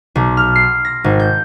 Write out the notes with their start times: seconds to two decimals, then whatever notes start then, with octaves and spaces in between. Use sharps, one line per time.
0.15 B1
0.37 F6
0.56 C7
0.85 A#6
1.04 G#1
1.20 G6